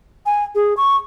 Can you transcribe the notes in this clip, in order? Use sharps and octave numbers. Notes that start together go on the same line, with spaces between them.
G#5
G#4
C#6